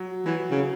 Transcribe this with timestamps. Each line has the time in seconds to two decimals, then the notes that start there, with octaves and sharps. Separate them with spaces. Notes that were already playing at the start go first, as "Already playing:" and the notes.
Already playing: F#3
0.26 E3 F#3
0.51 C#3